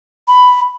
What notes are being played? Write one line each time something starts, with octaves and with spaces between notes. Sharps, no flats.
B5